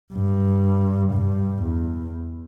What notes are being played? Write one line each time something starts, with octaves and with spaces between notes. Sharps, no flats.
G2
G2
E2